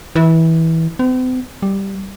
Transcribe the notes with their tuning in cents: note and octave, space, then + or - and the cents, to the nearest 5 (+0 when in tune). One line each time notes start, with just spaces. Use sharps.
E3 -20
C4 -45
G3 +0